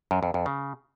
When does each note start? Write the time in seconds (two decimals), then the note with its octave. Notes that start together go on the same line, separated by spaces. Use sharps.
0.11 F#2
0.23 F2
0.34 F2
0.46 C#3